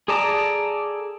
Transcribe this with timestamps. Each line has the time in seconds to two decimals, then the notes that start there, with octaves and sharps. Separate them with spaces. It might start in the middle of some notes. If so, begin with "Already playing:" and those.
0.08 G#4 A4 D5 A5 A#5